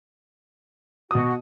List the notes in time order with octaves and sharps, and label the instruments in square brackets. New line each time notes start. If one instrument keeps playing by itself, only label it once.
[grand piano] B2 D#6 [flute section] F#4